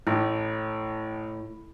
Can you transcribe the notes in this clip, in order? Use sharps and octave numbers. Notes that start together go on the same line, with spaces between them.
A1 A2